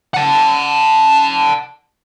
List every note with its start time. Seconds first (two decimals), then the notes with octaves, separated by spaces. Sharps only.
0.14 F#5 A5